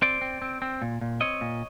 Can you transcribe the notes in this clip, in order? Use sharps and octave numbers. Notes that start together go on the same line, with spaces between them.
C4 C5 D5
C4
C4
C4
A#2
A#2
C4 C#5 D#5
A#2